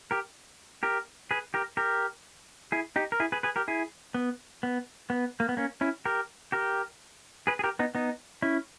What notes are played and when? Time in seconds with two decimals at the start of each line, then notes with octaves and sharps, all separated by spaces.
0.11 G4 A#4
0.83 G4 A#4
1.31 G#4 B4
1.54 G4 A#4
1.77 G4 A#4
2.72 E4 G#4
2.96 D#4 G4
3.12 A#4
3.20 E4 G#4
3.32 G#4 B4
3.43 G#4 B4
3.56 G4 A#4
3.68 E4 G#4
4.14 B3
4.63 B3
5.10 B3
5.40 A#3
5.49 B3
5.57 A#3 C#4
5.81 C#4 E4
6.05 G4 A#4
6.52 G4 A#4
7.47 G#4 B4
7.59 G#4
7.64 G4 A#4
7.79 B3 D#4
7.95 B3 D#4
8.42 C#4 E4